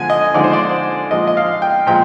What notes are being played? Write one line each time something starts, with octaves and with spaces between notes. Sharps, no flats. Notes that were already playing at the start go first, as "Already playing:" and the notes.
Already playing: D3 F3 G#3 G#5
D#5
D3 F3 G#3 D#4 D5
C5
D5
A#2 F3 G#3 D#5
D#5
F5
G5
A#2 F3 G#3 G5